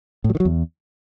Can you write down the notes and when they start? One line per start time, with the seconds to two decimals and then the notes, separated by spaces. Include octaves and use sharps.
0.24 A2
0.30 F#3
0.35 D#3
0.40 F#3
0.45 E2